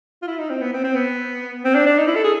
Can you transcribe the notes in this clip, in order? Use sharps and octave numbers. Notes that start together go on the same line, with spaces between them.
F4
E4
D#4
C4
B3
C4
C4
B3
C4
D4
D4
D#4
E4
A4
G#4